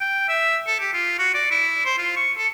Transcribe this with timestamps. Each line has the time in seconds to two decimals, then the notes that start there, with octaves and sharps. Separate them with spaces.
0.01 G5
0.28 E5
0.67 A4
0.80 G4
0.93 F4
1.19 F#4
1.34 D5
1.51 E4
1.85 C5
1.98 F4
2.16 C#6
2.37 A4